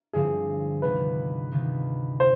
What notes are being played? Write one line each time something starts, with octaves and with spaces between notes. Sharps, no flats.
G2 D3 F3 C4 G#4
D2 C3 D#3 B3 F4 B4
D2 C3 D#3 B3 F4
C5